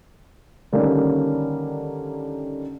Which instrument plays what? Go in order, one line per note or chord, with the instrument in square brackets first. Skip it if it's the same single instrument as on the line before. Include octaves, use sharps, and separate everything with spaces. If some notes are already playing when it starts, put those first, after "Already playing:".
[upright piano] D3 D#3 G3 A#3 C#4 D4